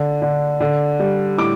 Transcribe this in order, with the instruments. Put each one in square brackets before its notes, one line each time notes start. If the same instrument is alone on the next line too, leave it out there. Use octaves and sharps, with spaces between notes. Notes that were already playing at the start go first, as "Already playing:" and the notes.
Already playing: [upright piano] D3
D3
D3
G3
A2 D6